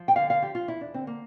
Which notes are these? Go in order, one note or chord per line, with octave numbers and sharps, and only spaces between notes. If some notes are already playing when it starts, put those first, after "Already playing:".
Already playing: F3
G5
D3 F5
F5
F3 G4
F4
E2 E4
D4
D3 C4
A#3